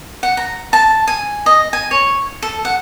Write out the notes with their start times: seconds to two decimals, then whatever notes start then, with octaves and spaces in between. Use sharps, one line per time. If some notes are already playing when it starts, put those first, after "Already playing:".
0.23 F#5
0.37 A#5
0.73 A5
1.08 G#5
1.46 D#5
1.73 G#5
1.91 C#5
2.42 A4
2.65 F#5